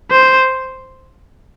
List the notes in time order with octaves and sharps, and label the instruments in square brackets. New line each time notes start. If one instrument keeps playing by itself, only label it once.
[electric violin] C5